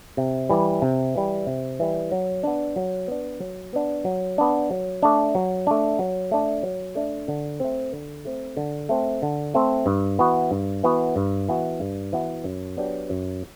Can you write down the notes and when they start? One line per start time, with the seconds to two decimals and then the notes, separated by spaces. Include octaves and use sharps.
0.17 C3
0.50 E3 G3
0.82 C3
1.15 E3 G3
1.47 C3
1.79 E3 G3
2.12 F#3
2.43 B3 D4
2.76 F#3
3.08 B3 D4
3.40 F#3
3.73 B3 D4
4.05 F#3
4.38 B3 D4
4.70 F#3
5.03 A3 D4
5.35 F#3
5.67 A3 D4
5.99 F#3
6.31 A3 D4
6.63 F#3
6.95 A3 D4
7.28 D3
7.60 A3 C4
7.93 D3
8.25 A3 C4
8.57 D3
8.89 A3 C4
9.22 D3
9.54 A3 C4
9.86 G2
10.19 E3 B3 F#4
10.51 G2
10.83 E3 B3 F#4
11.16 G2
11.49 E3 B3 F#4
11.81 G2
12.13 E3 B3 F#4
12.44 F#2
12.77 F#3 B3 D4 G4
13.10 F#2